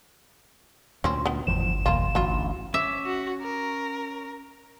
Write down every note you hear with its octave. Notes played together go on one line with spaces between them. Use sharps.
D2 A#2 C4 C#4
B3 G5
G1 E2 A2 F3 E7
B1 E2 A#3 F4
A1 D2 F#3 F4
C#4 E5 D6
F#4
A#4